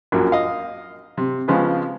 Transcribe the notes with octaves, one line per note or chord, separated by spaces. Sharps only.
A#1 F#2 F#3 A#3
D#5 F5
C3
C#3 F3 G#3 B3 C4